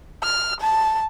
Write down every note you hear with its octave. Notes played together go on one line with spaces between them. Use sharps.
F6
A5